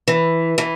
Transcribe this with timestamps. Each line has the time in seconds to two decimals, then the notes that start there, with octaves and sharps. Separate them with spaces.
0.08 E3
0.58 E3